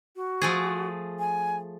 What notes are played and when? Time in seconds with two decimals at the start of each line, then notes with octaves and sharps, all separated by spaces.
0.16 F#4
0.42 F3 A3 G#4
1.19 G#5